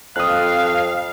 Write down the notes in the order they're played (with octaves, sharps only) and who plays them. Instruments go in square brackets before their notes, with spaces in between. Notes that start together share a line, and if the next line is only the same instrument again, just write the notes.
[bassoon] F2 [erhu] F5 [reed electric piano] D#6 F#6